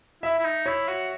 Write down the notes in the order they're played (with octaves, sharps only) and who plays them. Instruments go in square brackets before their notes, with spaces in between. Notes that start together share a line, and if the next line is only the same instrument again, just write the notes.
[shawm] E4 [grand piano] E5
[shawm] E4
D#4
[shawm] E4 [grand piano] C#5
[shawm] F#4